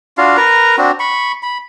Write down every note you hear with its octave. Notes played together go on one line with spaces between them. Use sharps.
D4 F4 F#4 F5
A#4 B4 A#5
C4 D4 F#4
B5 C#6
B5